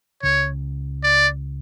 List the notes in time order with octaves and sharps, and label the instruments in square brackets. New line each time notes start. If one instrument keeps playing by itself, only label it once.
[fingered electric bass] C#2 C#3 [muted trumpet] C#5
[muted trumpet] D5